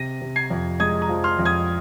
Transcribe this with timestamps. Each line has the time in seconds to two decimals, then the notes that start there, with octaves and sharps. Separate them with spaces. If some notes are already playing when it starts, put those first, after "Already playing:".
Already playing: C3 A#6 D#7
0.22 C3
0.36 G#6 C7
0.50 F2
0.80 G#3 D#6 G#6
1.02 A#5 D#6
1.09 F3
1.24 C6 F6
1.39 F2
1.45 D#6 G#6